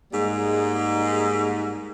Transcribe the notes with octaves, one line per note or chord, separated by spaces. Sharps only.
G#2 G3 G#3 A#3